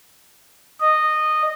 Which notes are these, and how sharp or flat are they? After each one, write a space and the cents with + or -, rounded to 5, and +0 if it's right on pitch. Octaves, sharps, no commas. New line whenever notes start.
D#5 -15